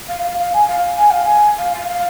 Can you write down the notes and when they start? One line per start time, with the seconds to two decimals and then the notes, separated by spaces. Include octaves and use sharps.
0.09 F5
0.24 F5
0.39 F5
0.54 G#5
0.69 F5
0.98 G#5
1.11 F5
1.25 G#5
1.58 F5
1.74 F5
1.88 F5